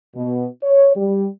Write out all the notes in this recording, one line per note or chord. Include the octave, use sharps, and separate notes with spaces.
B2
C#5
G3